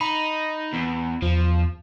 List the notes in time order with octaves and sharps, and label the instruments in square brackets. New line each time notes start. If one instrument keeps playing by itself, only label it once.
[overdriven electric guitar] D#4 [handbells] B5
[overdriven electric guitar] E2
[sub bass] E2 [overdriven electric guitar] F3